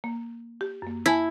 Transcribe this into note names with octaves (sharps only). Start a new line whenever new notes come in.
A#3
G4
F#2 A#3
E4 G#5 A5